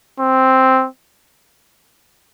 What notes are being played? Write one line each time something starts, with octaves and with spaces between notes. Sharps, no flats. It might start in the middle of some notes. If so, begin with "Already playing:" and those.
C4